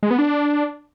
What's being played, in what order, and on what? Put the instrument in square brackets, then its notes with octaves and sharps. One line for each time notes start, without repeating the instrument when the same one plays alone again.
[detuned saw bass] G#3
B3
D4